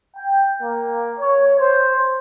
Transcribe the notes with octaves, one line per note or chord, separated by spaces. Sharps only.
G5
A#3
C#5
C5